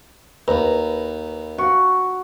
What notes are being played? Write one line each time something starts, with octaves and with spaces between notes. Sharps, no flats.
D#2 B4 A#5
F#4